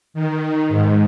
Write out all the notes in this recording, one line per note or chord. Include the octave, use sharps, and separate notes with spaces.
D#3
G#2